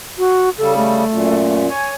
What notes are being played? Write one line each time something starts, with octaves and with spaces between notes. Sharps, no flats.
F#4
C#3 G3 A4
A3
F#2 A#2
C#5 G#5